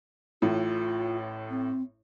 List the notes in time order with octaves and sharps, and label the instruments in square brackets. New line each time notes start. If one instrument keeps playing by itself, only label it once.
[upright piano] A1 A2 [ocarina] F4
[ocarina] C4